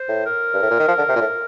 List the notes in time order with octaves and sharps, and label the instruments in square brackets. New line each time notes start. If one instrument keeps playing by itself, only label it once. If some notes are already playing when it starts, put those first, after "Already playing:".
Already playing: [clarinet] C5
[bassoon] A2
[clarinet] A#4
[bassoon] G2
A2
A#2
D#3
F3
D3
C3
A#2
A2